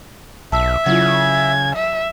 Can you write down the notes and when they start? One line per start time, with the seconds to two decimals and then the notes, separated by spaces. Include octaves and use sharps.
0.52 B1 E5 A5 E6
0.86 C#3 F#3 E4 F4 G#6
1.75 E5